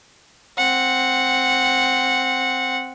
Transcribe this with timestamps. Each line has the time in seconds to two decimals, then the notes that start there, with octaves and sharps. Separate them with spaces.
0.57 C4 F#5